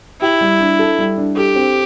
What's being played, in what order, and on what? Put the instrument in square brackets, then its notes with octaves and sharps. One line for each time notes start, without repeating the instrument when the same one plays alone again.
[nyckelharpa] E4 [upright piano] G4
[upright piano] G3
D4
A4
G3
D4
[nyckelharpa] G4 [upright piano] A4
[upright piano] C4